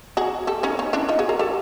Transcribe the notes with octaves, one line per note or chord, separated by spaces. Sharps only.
F#4 G#4
G4 A4
C#4 D#4
C#4 D#4
D4 E4
D#4 F4
F#4 G#4
G#4 A#4
G4 A4